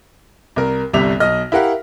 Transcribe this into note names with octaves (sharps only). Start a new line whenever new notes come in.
C2 A#4
G1 C2 G3 E5 F7
B1 D#5 F6 A#6
E4 G4 A#4 F5 F#5